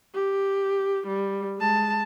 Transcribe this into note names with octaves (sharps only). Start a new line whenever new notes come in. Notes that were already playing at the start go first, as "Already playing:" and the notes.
G4
G3
G#3 A5